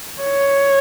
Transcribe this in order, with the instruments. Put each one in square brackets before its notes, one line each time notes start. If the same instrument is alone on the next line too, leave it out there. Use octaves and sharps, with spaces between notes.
[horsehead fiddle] C#5